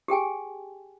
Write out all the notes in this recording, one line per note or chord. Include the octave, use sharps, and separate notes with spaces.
G4 G#4 G5 G#5